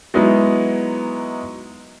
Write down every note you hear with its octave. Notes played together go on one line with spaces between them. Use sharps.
F#3 G#3 B3 D#4 E4